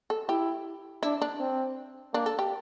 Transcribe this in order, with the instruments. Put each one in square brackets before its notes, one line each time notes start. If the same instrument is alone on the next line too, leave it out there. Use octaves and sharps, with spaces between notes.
[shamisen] A4
[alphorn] E4 [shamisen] G4
[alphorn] D4 [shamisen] E4
[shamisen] D4
[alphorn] C4
[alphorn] A#3 [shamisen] D4
[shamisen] A4
G4